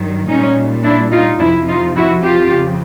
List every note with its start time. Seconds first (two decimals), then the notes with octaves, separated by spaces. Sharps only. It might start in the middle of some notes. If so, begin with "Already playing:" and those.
Already playing: G2 D#3 F#3
0.28 A#2 G3 C#4 D#4
0.84 D4 E4
1.12 D#4 F4
1.40 F2 C3 F3 D4 E4
1.68 D#4 F4
1.96 E4 F#4
2.24 F4 G4
2.52 F2 C#3